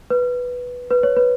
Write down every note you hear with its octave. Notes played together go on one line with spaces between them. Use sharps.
B4
B4
C#5
B4